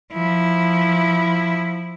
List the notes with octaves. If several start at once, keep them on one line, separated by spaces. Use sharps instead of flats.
F3 E4